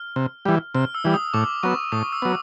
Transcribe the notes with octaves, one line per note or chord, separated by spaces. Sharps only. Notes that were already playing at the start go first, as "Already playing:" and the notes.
Already playing: F6
C3
E3 G3
C3 F6
E6
E3 G3
D#6
A2 D6
F#3 B3 C#6
A2 D#6
E6
F#3 B3